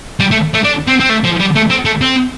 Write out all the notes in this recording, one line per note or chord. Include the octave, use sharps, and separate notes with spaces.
G3
A3
A3
D4
C4
C4
A3
F3
G3
A3
C4
A3
C4